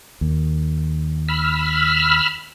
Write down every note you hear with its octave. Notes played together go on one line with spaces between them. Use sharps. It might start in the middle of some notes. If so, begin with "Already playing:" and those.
D#2
B5 E6 F6